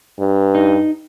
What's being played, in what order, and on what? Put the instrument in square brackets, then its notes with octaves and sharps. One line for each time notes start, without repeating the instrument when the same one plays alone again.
[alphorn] G2
[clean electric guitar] D#4